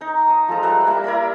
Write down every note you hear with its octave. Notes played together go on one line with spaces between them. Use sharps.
D#4 A#5
D#5 A5
F3 G#3 A4 A#5
G3 B4 E5 A#5
G3 A#3 E4 E5
E4 A#4 D5 B5